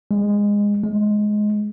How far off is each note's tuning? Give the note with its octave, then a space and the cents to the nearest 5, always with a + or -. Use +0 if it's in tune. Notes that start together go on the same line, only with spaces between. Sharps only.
G#3 -20
G#3 +10